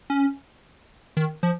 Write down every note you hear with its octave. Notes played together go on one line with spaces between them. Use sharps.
C#4
D#3
F3